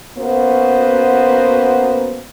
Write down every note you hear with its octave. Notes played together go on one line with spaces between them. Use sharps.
A#3 B3 C#4 F#4 C5